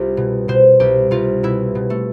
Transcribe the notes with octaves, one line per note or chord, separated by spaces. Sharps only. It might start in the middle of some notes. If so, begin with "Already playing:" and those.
Already playing: C2 F4 G4
B2
B2 C5
C2 G4
C2 F4
B2 E4
B2
A3